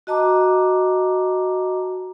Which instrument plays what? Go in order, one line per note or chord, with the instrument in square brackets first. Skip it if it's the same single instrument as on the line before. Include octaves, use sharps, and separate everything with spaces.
[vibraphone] F#4 D#5 A5 A#5 D6